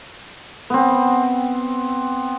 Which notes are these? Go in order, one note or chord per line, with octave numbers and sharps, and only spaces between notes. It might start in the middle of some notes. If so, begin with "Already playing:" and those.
B3 C4